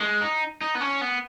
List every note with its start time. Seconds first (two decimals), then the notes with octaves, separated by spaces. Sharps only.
0.01 G#3
0.21 D#4
0.61 D#4
0.75 B3
0.81 C#4
1.01 B3